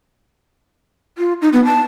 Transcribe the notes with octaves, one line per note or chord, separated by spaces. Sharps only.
F4
D#4
B3
A5